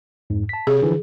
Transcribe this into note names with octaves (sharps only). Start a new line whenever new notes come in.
F2 G#2
A5 B6
C3 G#4 C#5
D3 E3 F3